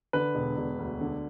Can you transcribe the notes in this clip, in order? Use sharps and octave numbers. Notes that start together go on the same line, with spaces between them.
D3 B4
E1
E1
D2
D3